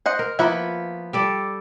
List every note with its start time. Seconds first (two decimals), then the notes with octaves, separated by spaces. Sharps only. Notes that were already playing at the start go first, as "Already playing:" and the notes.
0.06 C5 D#5 F#5
0.19 A#4
0.39 F3 A#3 B3 E4
1.13 G3 A4 D5